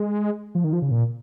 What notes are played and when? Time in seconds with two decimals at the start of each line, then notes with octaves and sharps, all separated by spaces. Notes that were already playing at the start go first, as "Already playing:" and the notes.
Already playing: G#3
0.55 F3
0.64 D#3
0.73 F3
0.82 C#3
0.91 A#2